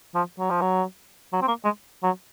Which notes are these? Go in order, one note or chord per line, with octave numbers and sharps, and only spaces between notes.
F3
F#3
F3
F#3
F#3
C4
A#3
G#3
F#3